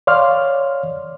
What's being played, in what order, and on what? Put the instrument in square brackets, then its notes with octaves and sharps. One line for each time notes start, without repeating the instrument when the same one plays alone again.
[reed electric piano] C#5 D5 F5 C6 F6